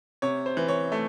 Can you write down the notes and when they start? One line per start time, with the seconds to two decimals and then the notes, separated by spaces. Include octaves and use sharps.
0.22 C3 C#5
0.46 C5
0.57 E3
0.68 C#5
0.92 A3